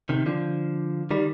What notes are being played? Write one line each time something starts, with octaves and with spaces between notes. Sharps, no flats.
C3 D#3
D3 F3
D#3 G3